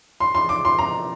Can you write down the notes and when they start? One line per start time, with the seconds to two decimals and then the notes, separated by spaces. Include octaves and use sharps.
0.20 C6
0.35 C6
0.49 D6
0.65 C6
0.79 A#5